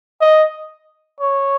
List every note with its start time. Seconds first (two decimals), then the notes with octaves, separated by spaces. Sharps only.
0.21 D#5
1.20 C#5